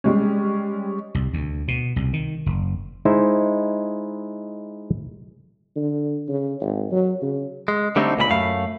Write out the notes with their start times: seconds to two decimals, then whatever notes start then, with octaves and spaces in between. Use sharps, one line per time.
0.04 G3 G#3 C#4
1.15 C2
1.33 D2
1.68 B2
1.96 C2
2.13 D#3
2.46 F#1
3.05 G#3 D#4 E4 C5 E5
5.76 D3
6.28 C#3
6.61 G#1
6.91 F#3
7.22 C#3
7.68 G#3
7.96 D3 G3 A3 C4 D4 D#4
8.17 C#2 A#2 A4 B5
8.30 F#2 A3 F5